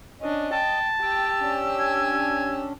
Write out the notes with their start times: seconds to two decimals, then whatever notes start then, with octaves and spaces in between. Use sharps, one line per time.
0.22 C#4 D4 D#5
0.53 G5 A5
1.01 G4 G5 E6
1.40 C#4 D4
1.80 G#5